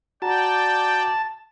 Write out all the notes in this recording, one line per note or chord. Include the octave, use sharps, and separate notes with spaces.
F#4 D5 F#5 G5 A5 A#5